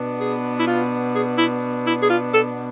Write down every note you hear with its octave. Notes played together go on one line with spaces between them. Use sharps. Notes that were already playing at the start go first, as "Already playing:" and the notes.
Already playing: B2 B3 D4
G#4
E4
F4
G#4
E4
E4
G#4
F4
A4